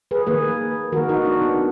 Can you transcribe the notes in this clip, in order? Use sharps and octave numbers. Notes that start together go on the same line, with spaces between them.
G#4 B4
D#3 A#3 G#4 B4
D#3 A#3 F#4 A#4
D#4 F#4
D4
B3 D#4